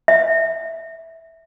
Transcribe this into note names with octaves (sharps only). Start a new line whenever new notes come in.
E5